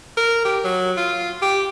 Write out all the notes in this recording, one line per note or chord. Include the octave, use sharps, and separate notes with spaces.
A#4
G4
F#3
F4
G4